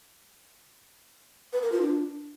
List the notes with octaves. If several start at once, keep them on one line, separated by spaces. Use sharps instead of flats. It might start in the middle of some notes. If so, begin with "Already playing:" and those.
B4
A#4
F4
D4